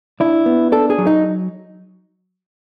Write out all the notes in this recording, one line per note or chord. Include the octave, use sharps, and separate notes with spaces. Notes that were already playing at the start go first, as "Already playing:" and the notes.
D4 E4
B3
D4 A4
G#4
F#3
D#4